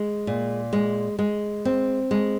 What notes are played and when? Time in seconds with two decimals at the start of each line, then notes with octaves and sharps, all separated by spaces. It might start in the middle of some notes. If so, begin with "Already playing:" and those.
Already playing: G#3
0.27 A#2
0.73 G#3
1.19 G#3
1.65 C4
2.11 G#3